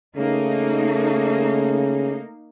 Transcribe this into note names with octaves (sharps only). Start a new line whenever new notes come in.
C#3 A3 A#3 D#4